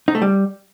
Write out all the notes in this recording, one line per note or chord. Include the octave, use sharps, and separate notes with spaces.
D#4
A3
G3